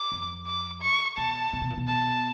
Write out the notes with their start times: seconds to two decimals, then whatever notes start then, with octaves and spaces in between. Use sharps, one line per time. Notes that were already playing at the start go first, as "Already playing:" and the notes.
Already playing: D6
0.12 F2
0.46 D6
0.82 C#6
1.17 B2 A5
1.53 C3
1.61 B2
1.70 A#2
1.78 B2
1.88 A5